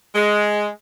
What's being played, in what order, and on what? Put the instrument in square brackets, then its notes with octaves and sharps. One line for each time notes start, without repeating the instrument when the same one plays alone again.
[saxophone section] G#3